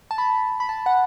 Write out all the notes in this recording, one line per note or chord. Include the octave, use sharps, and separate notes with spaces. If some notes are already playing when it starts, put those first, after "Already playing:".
A5
B5
B5
A5
F#5